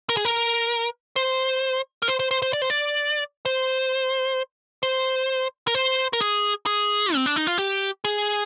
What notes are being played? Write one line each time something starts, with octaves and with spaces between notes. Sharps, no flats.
A#4
G#4
A#4
C5
A#4
C5
C5
C5
C5
D5
C5
D5
C5
C5
A#4
C5
A#4
G#4
G#4
C4
D4
D#4
F4
G4
G#4